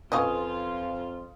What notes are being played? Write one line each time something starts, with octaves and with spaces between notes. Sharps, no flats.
F2 C#4 F4 B4 D#5 F5 G#5 D#6